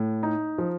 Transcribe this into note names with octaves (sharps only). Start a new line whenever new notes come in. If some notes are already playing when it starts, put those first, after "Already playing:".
Already playing: A2
D#4
F3